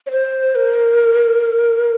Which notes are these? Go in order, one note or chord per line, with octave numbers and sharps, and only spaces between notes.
C#5
C5
A#4